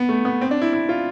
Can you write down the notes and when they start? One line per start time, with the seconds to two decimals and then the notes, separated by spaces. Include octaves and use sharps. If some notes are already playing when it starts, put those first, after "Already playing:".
Already playing: B3
0.09 A3
0.25 B3
0.41 C4
0.51 D4
0.62 E4
0.73 E4
0.89 F4